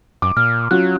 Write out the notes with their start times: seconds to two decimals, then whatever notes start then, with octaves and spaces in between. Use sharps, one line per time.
0.22 F#2 D6
0.37 A#2 F6
0.71 F#3 C#4 F4 F#4 F#6